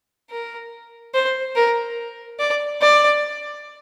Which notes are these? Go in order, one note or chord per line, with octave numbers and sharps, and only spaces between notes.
A#4
C5
A#4
D5
D5